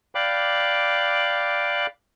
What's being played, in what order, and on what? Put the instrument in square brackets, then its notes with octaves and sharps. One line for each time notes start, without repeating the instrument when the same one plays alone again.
[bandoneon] D5 F5 G5 B5 D6 F#6